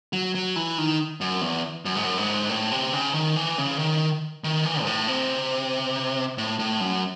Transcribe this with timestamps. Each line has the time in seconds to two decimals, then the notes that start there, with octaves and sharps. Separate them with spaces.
0.13 F#3
0.35 F#3
0.56 E3
0.78 D#3
1.21 F#2
1.42 E2
1.85 F#2
1.96 G#2
2.05 F#2
2.18 G#2
2.50 A2
2.72 C3
2.93 C#3
3.14 D#3
3.36 E3
3.58 C#3
3.79 D#3
4.44 D#3
4.65 E3
4.82 G#2
4.87 A2
5.08 C3
6.38 A2
6.59 A2
6.80 F#2